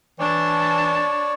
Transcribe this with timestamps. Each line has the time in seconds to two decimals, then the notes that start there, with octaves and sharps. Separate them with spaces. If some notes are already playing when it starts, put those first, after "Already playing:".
0.19 E3 D4 C#5 D5 A5